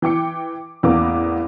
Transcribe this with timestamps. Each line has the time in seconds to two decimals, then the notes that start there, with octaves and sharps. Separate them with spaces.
0.02 E3 G5 D6 C#7
0.83 A1 E2 E3 A#3 B3 D6